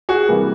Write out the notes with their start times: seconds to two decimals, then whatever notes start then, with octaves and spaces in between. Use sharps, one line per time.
0.09 F#4 G#4
0.28 C3 E3 G3 A#3